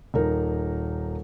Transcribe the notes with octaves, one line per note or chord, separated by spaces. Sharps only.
D#1 D#4 A#4